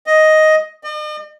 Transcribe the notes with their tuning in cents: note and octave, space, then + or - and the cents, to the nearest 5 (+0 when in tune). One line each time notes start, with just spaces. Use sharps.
D#5 +5
D#5 -45